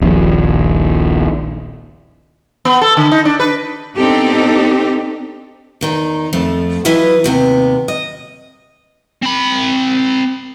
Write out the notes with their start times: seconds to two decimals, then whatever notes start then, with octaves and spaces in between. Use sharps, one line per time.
0.01 D#1 A#1
2.65 B3
2.81 A4
2.97 D3
3.11 D#4
3.25 D4
3.40 B4
3.97 B3 C4 D4 D#4 G4 A4
5.81 E2 D#3 D#4
6.33 F2 F3 A3
6.85 E3 F#3 E4 F4 B4 D#5
7.24 D#2 C3 B3
7.88 D#5
9.22 C4 B5